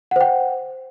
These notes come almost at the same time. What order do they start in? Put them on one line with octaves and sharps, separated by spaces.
F#5 C5 G5